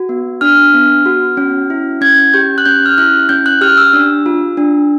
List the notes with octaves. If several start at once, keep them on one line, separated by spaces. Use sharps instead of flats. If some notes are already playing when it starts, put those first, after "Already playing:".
Already playing: F#4
B3
D4 F6
B3
F#4
C#4
E4
C#4 G#6
G4 G6
F#6
C#4 G6
F6
E4 F#6
C#4 G6
F#6
G4 F6
E6
D4
F4
D4